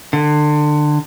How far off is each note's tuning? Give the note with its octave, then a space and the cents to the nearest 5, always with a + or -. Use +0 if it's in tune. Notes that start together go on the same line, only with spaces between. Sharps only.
D3 +25